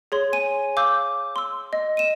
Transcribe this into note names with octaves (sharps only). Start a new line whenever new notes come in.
G#4 C#5 C6
G#5 D#7
F5 D6 E6 G6
C6 E6
D#5
D#7 E7